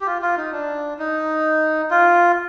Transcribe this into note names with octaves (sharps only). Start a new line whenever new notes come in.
G4
F4
F4
D#4
D4
D#4
F4